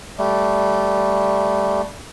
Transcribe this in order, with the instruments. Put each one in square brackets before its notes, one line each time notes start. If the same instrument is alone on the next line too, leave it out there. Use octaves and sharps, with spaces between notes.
[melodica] G3 A3